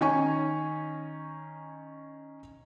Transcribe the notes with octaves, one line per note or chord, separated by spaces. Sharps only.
D#3 C#4 G#5 C#6